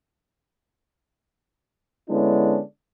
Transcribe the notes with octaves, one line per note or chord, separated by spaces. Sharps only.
D3 G#3 B3 C#4 D4 E4